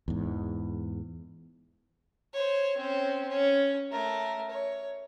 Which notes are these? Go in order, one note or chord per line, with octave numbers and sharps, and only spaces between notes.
E2 G#2
C5 C#5
C4 C#4
C#4
A3 A#4
C#5